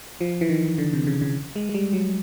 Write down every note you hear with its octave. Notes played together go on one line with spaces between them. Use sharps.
F3
E3
D#3
D3
C3
C#3
C#3
G#3
G#3
G3
F#3